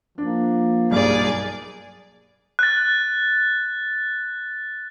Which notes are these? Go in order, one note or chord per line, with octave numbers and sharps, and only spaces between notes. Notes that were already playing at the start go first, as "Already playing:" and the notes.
F3 A#3 D4
B1 G2 G#4 D5
F#6 A6